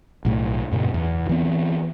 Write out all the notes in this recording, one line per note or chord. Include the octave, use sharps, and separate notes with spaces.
B1 A2 A3
F#2 A#2 C#3
E2
E3 B3 C4